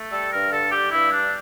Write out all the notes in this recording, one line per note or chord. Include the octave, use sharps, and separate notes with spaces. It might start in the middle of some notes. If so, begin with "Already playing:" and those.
Already playing: A3
G3 A4
G2 A#4
D3 A4
G3 G4
G2 E4
G3 D4